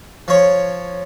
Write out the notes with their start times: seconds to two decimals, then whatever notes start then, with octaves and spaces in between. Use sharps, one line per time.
0.28 F3 C#5